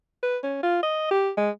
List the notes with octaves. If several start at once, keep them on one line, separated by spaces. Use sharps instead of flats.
B4
C#4
F4
D#5
G4
G#3